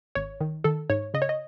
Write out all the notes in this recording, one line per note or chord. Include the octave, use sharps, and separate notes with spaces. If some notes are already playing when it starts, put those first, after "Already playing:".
G#1 C#5
D#3
D#3 A4
G#2 C#5
C#3 D#5
C#5
D#5